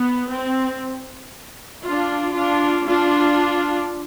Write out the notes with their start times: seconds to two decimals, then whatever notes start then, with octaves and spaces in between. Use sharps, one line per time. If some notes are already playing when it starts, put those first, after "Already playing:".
Already playing: B3
0.34 C4
1.85 D4 F4
2.36 D4 F4
2.87 D4 F4